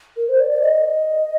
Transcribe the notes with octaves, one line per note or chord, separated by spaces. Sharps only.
A#4
C5
D5
D5
D#5